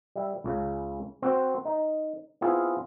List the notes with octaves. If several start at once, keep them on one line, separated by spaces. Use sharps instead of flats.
G3 E5
C#2 C#3
C4 F#4 C5
D#4
B3 C4 E4 F4 G#4